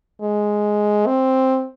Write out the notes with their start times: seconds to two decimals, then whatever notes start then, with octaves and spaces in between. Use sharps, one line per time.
0.21 G#3
1.07 C4